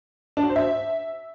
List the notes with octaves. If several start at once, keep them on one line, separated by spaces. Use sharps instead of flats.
D4
F#4
C5
E5